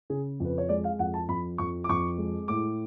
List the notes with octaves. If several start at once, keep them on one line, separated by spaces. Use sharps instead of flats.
C#3 G#4
F2 B4
C#5
G#3 D5
F5
F2 F#5
A5
F2 B5
F2 C#6
D6
F2 C#6
G#3
A2 D6